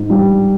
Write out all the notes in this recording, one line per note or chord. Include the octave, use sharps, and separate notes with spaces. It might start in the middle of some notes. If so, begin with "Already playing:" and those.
Already playing: G#2
G3